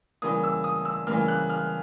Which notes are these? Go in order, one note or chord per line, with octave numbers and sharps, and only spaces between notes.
C#3 E3 G3 A#3 D#6
E6
D#6
E6
C#3 E3 G3 A#3 F6
F#6
F6